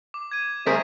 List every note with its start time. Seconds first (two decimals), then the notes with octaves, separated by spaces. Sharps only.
0.14 D6
0.31 G#6 D#7
0.66 G3 A3 G#4 A#4 C5 B6